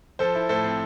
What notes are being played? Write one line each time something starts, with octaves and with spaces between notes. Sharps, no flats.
F3 A4 C5
E4
A2 A4 C5
C4